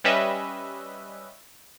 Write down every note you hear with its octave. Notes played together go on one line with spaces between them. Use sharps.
G3 C#4 B4 D#5 E5